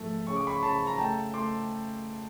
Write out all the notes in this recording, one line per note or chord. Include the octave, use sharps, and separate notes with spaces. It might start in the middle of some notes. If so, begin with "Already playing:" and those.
Already playing: G#2 F3 A3
C#3 C#6
D6
B5 C#6
C#3 A5 B5
A#5
A3 G5 A5
A3 C6 D6